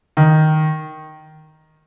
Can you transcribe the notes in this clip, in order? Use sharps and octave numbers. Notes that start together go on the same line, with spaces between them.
D#3